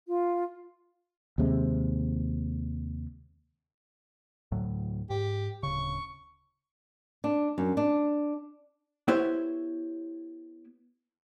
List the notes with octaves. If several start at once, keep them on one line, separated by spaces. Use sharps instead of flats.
F4
D#2 C3 G#3
D2 A2 F#3
G#2 G4
D1 C#3 C#6
D4
F#2
D4
B3 E4 G4 C5 C#5